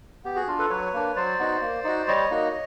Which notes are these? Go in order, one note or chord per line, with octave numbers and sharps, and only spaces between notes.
B3 G4
F#4 G#4
D4 F4
A4 B4
F#3 B4 C#5
A#3 D4
F#3 C5 D5
B3 D#4 F#4
A#3
D#4 F#4
G3 C#5 D#5
A#3 D#4 F#4